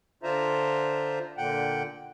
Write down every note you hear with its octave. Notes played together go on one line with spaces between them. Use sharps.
D3 D4 F4 C5 E5 A#5
A#2 D3 F#5 G5